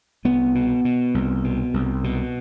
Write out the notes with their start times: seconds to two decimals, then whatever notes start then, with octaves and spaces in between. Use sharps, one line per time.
0.25 C2 B3
0.55 B2
0.85 B2
1.14 C2
1.44 B2
1.74 C2
2.04 B2